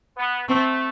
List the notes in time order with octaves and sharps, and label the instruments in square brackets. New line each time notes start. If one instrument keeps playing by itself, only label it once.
[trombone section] B3
[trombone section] A3 [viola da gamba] C4